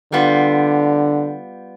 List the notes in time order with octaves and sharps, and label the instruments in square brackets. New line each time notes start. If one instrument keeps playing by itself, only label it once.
[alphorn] D3 [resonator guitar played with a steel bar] G3 B3 F4